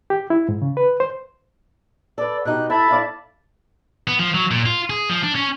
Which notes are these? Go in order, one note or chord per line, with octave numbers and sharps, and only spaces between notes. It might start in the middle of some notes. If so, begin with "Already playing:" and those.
G4
E4
G#2
C#3
B4
C5
A4 B4 D5
B2 D#4 G4 F#6
E4 A4 E5 A5 B5
E4 D5 F5
B3
F3
F#3
A#2
F4
G#4
F3
D4
C#4